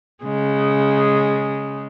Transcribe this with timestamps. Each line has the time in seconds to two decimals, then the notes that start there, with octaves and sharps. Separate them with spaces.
0.23 C#3 G#3